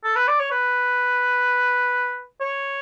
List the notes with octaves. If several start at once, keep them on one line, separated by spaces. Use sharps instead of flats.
A4
B4
D5
C#5
B4
C#5